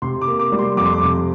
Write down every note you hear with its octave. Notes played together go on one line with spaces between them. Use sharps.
C3 C6
D6
A#3
D6
G3
C6
F2 D6
C6
D6
C3